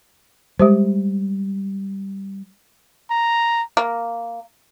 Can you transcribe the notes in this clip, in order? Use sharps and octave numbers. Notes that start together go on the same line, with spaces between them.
G3 G#3 G4 C5
A#5
A#3